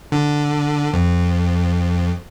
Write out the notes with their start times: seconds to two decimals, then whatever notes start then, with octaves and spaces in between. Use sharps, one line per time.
0.12 D3
0.93 F2